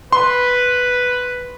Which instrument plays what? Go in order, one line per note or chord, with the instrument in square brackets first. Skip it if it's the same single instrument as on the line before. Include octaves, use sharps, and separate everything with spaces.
[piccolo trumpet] B4 [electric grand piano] C6